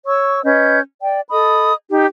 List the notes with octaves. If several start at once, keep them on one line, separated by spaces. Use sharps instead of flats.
C#5 C#6 E6
C#4 B4 D#5 G6
D5 G5
A4 D#5 B5 D#6
D#4 G4